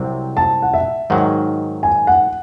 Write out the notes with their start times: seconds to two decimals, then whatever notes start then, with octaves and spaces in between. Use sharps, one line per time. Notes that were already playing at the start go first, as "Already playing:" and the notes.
Already playing: C2 C3 F#3 C4
0.37 A5
0.62 F#5
0.74 E5
1.10 G#2 D#3 F#3 F#5
1.83 G#5
2.07 F#5